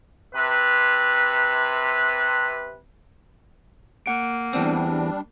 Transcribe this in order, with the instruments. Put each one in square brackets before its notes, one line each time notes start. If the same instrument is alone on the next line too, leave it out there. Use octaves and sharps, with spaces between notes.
[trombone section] C3 B4
[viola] A#3 [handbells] F#5 D7
[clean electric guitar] E2 C4 [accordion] G3 D4